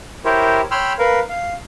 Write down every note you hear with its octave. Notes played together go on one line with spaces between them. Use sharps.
E4 G4 A#4 C5 C#5
C#5 G5 B5 C6 E6 F6
A#4 B4 F5
F5